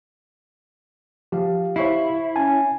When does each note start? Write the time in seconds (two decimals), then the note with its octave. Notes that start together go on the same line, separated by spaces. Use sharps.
1.32 F3 G4 F5
1.76 E4 C5 C#6 C7
2.36 C#4 G#5 A5